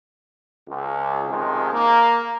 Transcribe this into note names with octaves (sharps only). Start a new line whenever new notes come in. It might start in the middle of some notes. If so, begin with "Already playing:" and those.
C#2
C3 D#3 F3 G#3
A#3